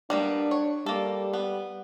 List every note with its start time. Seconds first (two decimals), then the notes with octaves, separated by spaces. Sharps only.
0.10 G3 A#3 B3 D4
0.51 C#5
0.86 G3 A#3 A4
1.33 B3